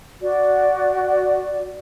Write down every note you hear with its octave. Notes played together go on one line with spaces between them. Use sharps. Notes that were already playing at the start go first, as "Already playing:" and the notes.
F#4 D5